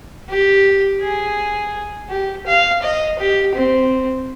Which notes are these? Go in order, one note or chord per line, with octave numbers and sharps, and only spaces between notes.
G4
G#4
G4
F5
D#5
G4
C4